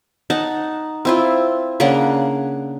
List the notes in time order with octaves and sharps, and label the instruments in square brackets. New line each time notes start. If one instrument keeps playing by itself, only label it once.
[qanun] D#4 F#5 A5
C4 E4 F4
C#3 A#3 D4 F#5